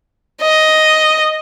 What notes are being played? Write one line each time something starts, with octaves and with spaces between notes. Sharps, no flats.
D#5